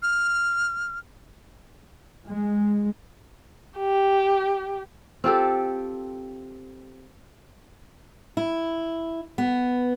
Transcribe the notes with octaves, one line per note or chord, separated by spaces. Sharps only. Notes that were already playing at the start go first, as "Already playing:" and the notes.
F6
G#3
G4
C4 F4 G4 A4
E4
B3